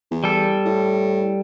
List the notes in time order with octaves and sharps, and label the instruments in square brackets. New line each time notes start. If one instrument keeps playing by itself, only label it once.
[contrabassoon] E2
[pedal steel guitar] G3 A4
[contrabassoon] A2